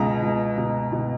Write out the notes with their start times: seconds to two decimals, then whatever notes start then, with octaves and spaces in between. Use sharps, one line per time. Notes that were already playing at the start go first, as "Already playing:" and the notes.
Already playing: C#2 B2 A#5
0.22 C#2
0.57 B2
0.92 B2